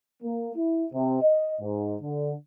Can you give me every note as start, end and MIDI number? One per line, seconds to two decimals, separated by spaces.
0.23 0.52 58
0.56 0.87 64
0.93 1.20 48
1.22 1.56 75
1.61 1.95 44
2.02 2.33 50